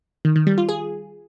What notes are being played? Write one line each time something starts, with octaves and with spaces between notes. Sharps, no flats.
D#3
D#3
G3
F4
G#4